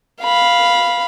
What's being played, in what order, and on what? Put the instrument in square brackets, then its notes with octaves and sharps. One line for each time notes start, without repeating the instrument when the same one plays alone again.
[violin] F5 B5